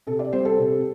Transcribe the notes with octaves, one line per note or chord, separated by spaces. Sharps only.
C3 A4
D5
G3 C4 C5
A4
C3